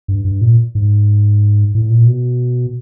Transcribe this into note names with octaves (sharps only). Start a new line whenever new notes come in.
G2
G2
A#2
G#2
A2
A#2
B2